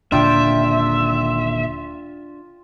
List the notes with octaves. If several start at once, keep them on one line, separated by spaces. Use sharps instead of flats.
D#1 A#2 D3 D4 F4 E5 G5